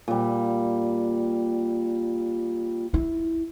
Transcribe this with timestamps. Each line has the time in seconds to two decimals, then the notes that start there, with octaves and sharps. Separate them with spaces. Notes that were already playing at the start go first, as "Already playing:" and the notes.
0.08 A#2 G3
2.94 E4